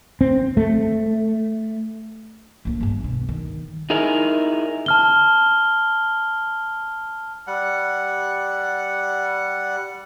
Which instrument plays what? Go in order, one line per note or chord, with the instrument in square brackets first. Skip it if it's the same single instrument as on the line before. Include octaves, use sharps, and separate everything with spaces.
[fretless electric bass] C4
A3
[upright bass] A#1 A#3
E2 G2
B2
D#3
[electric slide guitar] D#4 E4 G#4 A#4
[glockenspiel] A5 F6 G7
[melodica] G3 F#5